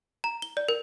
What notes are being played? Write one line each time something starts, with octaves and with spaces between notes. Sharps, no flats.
A#5
G7
D5
A#4